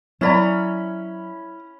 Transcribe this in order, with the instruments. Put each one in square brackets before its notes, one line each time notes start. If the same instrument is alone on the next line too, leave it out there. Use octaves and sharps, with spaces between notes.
[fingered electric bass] F#3 [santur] C#4 B5 [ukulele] E4 D5 A#5